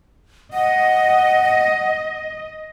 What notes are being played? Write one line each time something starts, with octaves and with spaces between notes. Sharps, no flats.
D#5 F#5